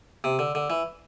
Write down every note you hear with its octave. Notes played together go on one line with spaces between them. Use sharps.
C3
D3
D3
E3